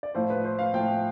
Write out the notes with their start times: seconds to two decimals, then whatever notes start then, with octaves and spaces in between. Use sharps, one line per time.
0.03 D5
0.15 A2 F3 C5
0.30 B4
0.45 C5
0.59 F5
0.74 A2 F3 G5